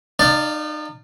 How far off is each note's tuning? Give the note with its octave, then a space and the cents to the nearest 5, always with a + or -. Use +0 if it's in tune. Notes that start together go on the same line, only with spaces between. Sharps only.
D#4 -35 D5 +0 F5 +0